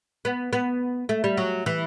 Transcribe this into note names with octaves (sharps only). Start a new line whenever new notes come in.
B3
B3
A3
G3
F#3
E3